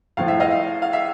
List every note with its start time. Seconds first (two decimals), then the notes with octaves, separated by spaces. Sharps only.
0.17 A2 F3 F5
0.28 E5
0.40 D#5 F5
0.82 F5
0.93 E5